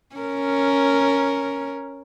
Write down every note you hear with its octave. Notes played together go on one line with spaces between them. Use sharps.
C#4 A#4